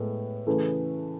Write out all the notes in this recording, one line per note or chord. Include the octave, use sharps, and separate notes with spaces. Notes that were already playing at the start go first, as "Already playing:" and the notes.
Already playing: A2 G#3 B3
C#3 E3 A3